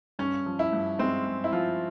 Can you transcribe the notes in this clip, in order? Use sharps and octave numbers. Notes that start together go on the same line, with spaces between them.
G2 C#4
F3
E4
G2
G#3 C4
G#3
E4
F3 F4